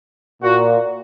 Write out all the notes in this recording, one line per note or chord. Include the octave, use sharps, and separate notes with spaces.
A#2 F#4